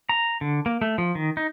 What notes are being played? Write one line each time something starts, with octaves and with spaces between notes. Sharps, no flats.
A#5
D3
A#3
A3
F3
D#3
D#4